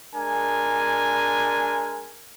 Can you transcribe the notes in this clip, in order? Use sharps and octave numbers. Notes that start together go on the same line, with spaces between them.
G#3 D4 A#4 G#5